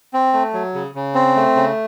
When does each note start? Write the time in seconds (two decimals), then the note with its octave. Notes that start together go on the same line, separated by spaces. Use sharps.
0.13 C4
0.33 A3
0.53 F#3
0.74 C#3
0.95 C#3
1.15 C4
1.36 A3
1.56 C#3